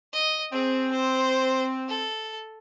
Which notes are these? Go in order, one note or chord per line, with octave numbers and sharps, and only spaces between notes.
D#5
C4 G#4
C5
A4